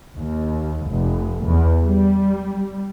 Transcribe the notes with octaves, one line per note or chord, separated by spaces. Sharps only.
D#2
F1
E2
G3